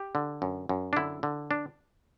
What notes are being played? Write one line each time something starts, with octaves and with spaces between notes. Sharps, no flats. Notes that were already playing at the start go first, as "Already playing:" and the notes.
Already playing: G4
D3
F#2
F#2
D4
D3 E4
D3
D4